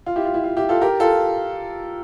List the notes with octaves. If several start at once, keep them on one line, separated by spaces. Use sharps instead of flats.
F4
E4 G4
F4
E4
F4
E4 G4
F4 A4
G4 A#4
F4 A4